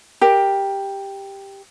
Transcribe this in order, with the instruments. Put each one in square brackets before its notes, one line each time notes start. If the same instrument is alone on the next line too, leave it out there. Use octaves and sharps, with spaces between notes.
[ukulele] G4 A#4